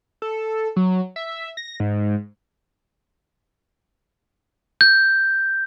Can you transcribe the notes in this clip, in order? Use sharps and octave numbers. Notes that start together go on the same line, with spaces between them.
A4
F#3
E5
A#6
G#2
G6